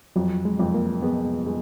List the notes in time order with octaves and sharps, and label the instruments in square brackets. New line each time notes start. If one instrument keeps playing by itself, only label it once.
[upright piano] F2 [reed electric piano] F#3
[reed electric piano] G#3
[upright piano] F2
[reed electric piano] A#3
[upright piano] G#3 [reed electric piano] B3
[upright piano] G#3